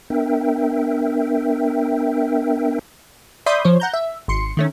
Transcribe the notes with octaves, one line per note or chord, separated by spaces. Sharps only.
B3 D4 A#4 E5 G5
D5 E5 B5 C6 D#6 G6
F3 C5 C#5
F#5 A#5 G6
E5
G#1 C6 C#7
D#3 A3 C#4